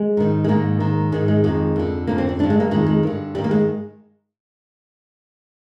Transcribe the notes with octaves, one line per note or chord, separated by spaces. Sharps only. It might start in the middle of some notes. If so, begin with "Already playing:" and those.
Already playing: G#3
G#2 D#3
G#3
G#2 D#3 A#3
G#2 D#3
G#2 D#3 G#3
G#3
F2 D#3 G#3
F2 D3
F2 D3 A#3
C4
D4
G2 D3 D4
G#3
A#3
F2 D#3 G#3
G#3
G2 D3
G2 D#3 G3
A#3
G#3